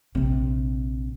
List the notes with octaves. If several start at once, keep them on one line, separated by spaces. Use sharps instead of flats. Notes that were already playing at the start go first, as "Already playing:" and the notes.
A#1 C3